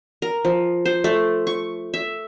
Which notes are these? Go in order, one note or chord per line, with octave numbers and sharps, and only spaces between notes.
A#4
F3
C5
A3
C#6
E5